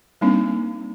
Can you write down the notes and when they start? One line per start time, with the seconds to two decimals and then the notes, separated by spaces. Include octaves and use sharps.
0.21 G3 A#3 C4 D4 D#4